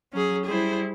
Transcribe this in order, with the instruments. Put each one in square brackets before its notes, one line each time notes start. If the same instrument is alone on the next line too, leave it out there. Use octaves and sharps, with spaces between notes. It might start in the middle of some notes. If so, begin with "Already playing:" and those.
[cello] F#3 [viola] C#4 G#4
[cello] G3 E4 [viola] G#4 C5